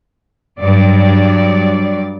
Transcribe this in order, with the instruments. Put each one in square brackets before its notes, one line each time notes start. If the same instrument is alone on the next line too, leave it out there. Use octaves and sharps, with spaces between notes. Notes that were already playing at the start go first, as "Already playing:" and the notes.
[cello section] G2 F#3 D5